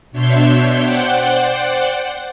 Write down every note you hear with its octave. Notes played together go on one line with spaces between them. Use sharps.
B2 D4 C#5 E5 C6 G6
C5 D5 F#5 G5